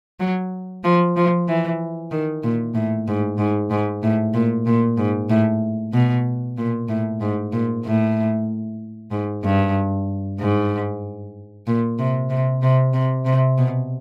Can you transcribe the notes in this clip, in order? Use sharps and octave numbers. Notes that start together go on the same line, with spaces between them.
F#3
F3
F3
E3
D#3
A#2
A2
G#2
G#2
G#2
A2
A#2
A#2
G#2
A2
B2
A#2
A2
G#2
A#2
A2
G#2
G2
G#2
A#2
C3
C3
C3
C3
C3
B2